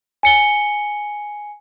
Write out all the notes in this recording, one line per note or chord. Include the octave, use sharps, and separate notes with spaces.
G#5 C#7 G7